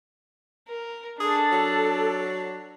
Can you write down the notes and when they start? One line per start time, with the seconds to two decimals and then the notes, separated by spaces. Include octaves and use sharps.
0.69 A#4
1.20 D4 G#4 A4
1.52 F#3